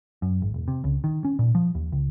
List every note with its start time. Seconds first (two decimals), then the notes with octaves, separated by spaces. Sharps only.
0.22 F#2
0.42 G#1
0.54 E1
0.68 C3
0.84 C#2
1.04 D#3
1.25 C#4
1.39 A#2
1.55 F3
1.75 D#2
1.92 C#2